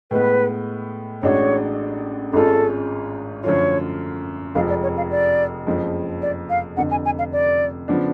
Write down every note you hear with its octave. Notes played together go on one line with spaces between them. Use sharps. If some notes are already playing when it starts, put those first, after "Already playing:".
A2 G#3 B3 B4
A1 A2 G#3 D4 F#4 C#5
G#1 G#2 G#3 C#4 F4 A4
F#2 D3 F3 A3 F4 C#5
F1 F2 F3 G#3 F5
D5
C#5
F5
D5
F#1 F2 F3 G#3
D5
F5
F1 F2 D3 F#5
G#5
G#5
F5
D5
C#3 F3 B3 D4